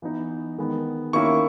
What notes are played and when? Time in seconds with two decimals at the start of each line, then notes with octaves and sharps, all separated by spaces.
0.02 E3 B3 D#4
0.58 D#3 G#3 B3
1.13 D#3 A#3 C#4 E4 C#6